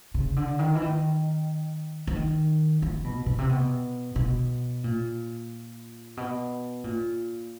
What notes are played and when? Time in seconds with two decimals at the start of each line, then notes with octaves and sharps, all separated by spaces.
0.14 C#3
0.36 D3
0.59 D#3
0.75 E3
0.82 D#3
2.07 E3
2.15 D#3
2.82 E3
3.04 B2
3.26 B2
3.38 C3
3.49 B2
4.16 B2
4.84 A#2
6.17 B2
6.84 A#2